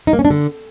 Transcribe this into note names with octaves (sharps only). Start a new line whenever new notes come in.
D#4
A#3
C#4
D4
D3